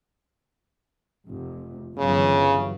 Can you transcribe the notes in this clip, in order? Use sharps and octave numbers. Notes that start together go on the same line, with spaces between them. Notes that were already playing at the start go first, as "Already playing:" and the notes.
F1
G1 C#3 E3 F#3